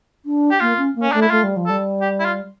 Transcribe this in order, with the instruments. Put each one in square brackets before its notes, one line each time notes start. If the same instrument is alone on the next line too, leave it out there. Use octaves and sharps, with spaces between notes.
[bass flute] D4
[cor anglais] G4
[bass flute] A#3 [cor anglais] F4
[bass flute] C#4
A#3
[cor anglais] C#4
[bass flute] A3 [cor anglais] D4
[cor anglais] E4
[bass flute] A3 [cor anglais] F4
[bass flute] G3
F3
[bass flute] G3 [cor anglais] A4
[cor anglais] G4
E4
F4